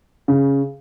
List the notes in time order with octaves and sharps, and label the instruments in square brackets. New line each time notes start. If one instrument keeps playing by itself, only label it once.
[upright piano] C#3